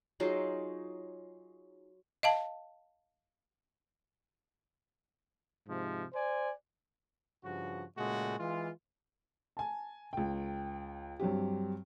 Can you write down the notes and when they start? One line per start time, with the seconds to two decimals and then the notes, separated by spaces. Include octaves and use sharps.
0.20 F#3 D#4 F4 G#4
2.23 D#5 F5 A5
5.67 G#2 C3 F3
6.14 C5 D5 G#5
7.44 G2 C#3 F3 F#4
7.97 A#2 C#3 G#3 A3 F#4
8.39 E3 G#3 F4
9.57 G#5 A5
10.13 C#2 G5
11.20 G2 F#3 C4 G4